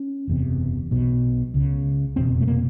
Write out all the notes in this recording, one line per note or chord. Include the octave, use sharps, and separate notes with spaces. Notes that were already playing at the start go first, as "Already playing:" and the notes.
Already playing: C#4
F#1 E2 C3
B1 B2
C#2 C#3
F1 E2 B2 C4
A3
A#3